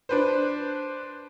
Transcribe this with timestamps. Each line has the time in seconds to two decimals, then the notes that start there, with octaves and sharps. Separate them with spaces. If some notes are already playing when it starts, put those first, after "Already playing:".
0.09 D4 B4 C5